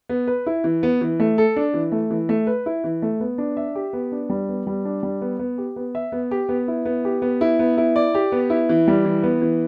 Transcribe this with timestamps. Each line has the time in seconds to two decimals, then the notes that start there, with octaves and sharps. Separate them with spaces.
0.09 B3
0.27 B4
0.46 E4
0.64 E3
0.83 B3
1.01 E3
1.20 A3
1.38 A4
1.56 D4
1.74 E3
1.92 A3
2.11 E3
2.29 A3
2.47 B4
2.66 E4
2.84 E3
3.02 A3
3.20 B3
3.38 D4
3.57 E5
3.75 G4
3.93 B3
4.12 D4
4.30 G3
4.49 B3
4.67 G3
4.85 D4
5.03 G3
5.22 B3
5.39 B3
5.58 G4
5.76 B3
5.95 E5
6.12 B3
6.31 G4
6.49 B3
6.68 E4
6.85 B3
7.05 G4
7.22 B3
7.41 E4
7.59 B3
7.77 E4
7.96 D5
8.15 G4
8.32 B3
8.50 E4
8.69 E3
8.88 G3
9.05 E3
9.23 B3
9.42 E3